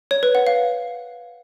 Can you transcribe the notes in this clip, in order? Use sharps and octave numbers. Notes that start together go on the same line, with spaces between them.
C#5
B4
F#5
F5